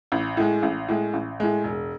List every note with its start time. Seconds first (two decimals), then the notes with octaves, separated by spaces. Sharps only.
0.12 A1
0.37 A2 G#3
0.63 A1
0.88 A2 G#3
1.13 A1
1.40 A2 G#3
1.64 E1